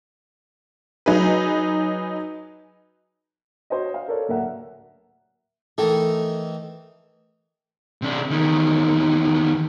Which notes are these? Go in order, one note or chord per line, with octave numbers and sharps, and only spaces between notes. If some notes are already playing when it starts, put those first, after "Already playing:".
F#3 D#4 G#4 B4
F#4 C5 C#5 D#5
F5
A4 A#4 C#5 D5
D1 A#3 A#4 E5 F#5
D#3 E3 A3 A4
C3 D4
E2 D#3